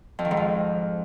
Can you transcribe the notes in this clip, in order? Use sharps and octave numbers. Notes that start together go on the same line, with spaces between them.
F2
D#3
G#2
F2